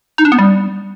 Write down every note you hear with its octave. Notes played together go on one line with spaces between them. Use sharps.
D#4
D4
B3
G3